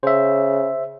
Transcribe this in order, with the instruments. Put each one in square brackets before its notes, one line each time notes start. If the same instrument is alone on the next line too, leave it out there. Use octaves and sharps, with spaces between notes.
[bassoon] C#3 [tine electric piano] C5 E5